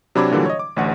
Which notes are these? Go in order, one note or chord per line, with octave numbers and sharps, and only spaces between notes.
C3 F#3 D4 B5 D6 G#6
A#2 D3 E3 F#3 G3
C#5 D#5
D6
A1 D2 F#5